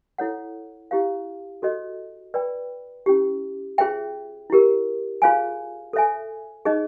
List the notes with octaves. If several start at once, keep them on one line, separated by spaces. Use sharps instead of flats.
E4 A4 C#5 F#5
E4 G4 C5 F5
F#4 A4 C5 D#5
B4 D5 G5 B5
C#4 E4 G4
F4 G#4 C5 E5 G5
E4 G4 A#4
F4 G#4 C5 F5 G#5
A4 C5 E5 G#5
D#4 G#4 C5 D#5